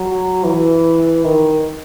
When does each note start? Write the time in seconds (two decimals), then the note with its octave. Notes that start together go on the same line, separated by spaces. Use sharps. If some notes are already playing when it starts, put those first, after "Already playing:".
Already playing: F#3
0.44 E3
1.24 D#3